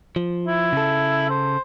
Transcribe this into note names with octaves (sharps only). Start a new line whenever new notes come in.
F3
E4
C#3 A4
C5